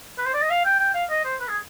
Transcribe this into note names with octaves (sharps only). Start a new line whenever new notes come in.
B4
C5
D5
D#5
F5
G5
G5
F5
D#5
C5
B4
G#4